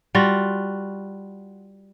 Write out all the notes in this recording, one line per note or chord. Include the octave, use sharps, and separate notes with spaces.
G3 F4 F#4